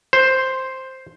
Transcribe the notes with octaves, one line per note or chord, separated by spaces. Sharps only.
C5